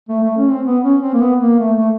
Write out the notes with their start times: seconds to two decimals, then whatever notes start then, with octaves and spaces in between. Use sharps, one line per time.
0.09 A3
0.23 A3
0.37 C#4
0.51 C4
0.65 B3
0.84 C#4
1.02 C4
1.14 A#3
1.21 B3
1.41 A#3
1.59 A3
1.78 A3